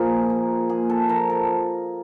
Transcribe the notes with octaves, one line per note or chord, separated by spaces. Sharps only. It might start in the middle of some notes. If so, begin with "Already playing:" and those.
Already playing: A#2 F3 G#4 A#4
A#3
A#3 G#4
A4
F3 A#4
A4